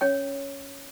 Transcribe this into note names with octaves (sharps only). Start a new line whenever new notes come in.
C#4 C#5 G5